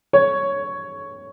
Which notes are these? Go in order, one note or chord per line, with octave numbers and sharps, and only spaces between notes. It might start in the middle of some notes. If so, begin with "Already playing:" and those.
C#5